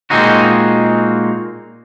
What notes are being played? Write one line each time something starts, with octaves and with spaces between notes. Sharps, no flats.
A#2 G#3 A#3 C4 D#4 F#4